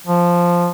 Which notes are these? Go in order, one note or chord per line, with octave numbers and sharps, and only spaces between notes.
F3